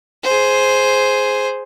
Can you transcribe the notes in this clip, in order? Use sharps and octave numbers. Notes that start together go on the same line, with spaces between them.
G#4 C5